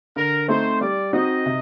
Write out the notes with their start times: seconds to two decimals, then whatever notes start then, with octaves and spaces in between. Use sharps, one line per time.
0.16 D3 A#4
0.48 A3 C4 D#4 C5
0.81 G3 D5
1.13 C4 D#4 F#4 D#5
1.46 C3